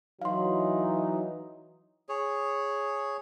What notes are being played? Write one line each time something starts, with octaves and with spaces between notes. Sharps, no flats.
E3 F#3 D#4 F5 C6
G#4 C#5